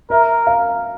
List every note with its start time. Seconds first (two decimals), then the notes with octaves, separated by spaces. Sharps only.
0.10 A#4 E5
0.47 F5